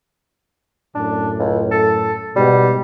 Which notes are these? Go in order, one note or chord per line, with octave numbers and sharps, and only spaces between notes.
F#2 A2 D4
C#2
A4
G#2 B2 G3